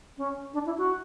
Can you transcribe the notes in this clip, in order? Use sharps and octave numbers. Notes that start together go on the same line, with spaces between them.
C#4
D4
E4
F#4